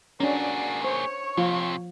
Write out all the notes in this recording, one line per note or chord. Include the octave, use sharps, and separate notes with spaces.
A#3 C#4 D4 F#4 G#4 D5
C5 C#5 C#6
F2 C3 F3 F4